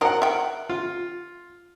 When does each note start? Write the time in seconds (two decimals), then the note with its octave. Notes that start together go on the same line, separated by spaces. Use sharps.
0.01 F3 F#3 D#4 A#4 F#5
0.22 E5 G5
0.70 F4